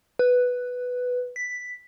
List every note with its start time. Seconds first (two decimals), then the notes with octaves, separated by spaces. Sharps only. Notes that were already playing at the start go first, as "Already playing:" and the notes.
0.19 B4
1.36 B6